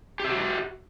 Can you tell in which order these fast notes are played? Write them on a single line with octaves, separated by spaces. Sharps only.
G4 E5 F#4